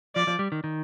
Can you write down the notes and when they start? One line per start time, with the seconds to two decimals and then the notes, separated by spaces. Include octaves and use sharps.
0.15 F3 D5
0.27 F3
0.39 G3
0.52 D#3
0.64 D#3